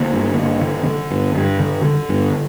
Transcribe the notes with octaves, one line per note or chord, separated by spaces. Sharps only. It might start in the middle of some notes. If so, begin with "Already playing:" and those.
Already playing: D3 A#3
G2
G2
D3
D3
G2
G2
D3
D3
G2